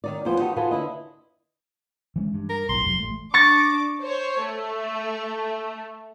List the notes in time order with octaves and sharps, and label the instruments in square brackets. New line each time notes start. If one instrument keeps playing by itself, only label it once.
[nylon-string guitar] D#3 D#4 D5
E2 F3 B3 C5
D#4 F#4 G4 A4 B4
F4 F#4 G#4 A4 B4 C5
D3 E4 D#5
[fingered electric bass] E3 G#3 C#4
G2
[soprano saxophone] A#4
[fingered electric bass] B1 A2 [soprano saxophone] C6
[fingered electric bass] F1 F#3
A1 A3
[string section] D4 D6 [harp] C#6 A6 A#6
[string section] C5 C#5
A3